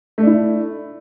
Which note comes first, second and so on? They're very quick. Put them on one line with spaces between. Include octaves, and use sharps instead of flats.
A3 D4 E4